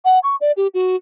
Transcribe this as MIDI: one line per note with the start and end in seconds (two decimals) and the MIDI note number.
0.05 0.19 78
0.23 0.36 85
0.41 0.52 74
0.57 0.67 67
0.74 0.96 66